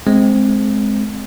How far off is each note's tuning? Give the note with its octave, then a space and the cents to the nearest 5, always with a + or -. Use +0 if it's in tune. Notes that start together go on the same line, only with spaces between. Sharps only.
G#3 +20 C4 +0